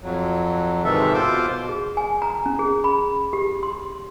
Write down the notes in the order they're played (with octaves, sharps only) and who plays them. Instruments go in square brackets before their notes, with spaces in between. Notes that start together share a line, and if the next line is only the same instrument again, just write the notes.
[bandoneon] F2 F#3
G#2 C3 D#3 E3 A4 E5
B2 F4 C5 D6
[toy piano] G#4
G#5
A#5
C#4
G#4
B5
G4
C6